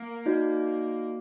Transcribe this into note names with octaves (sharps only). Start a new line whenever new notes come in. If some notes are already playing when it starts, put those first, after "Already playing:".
Already playing: A#3
D#4 F#4 D5